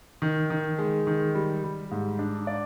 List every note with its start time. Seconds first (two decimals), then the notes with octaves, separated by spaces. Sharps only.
0.22 D#3
0.50 D#3
0.79 G#3
1.07 D#3
1.35 G3
1.64 G3
1.91 G#2
2.19 D4
2.47 D5